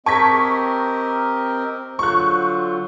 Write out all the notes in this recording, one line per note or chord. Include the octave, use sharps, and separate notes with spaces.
C4 G4 A#4 D#5 A5 C#6 G#6 B6
D3 F#3 F4 C5 C#6 F#6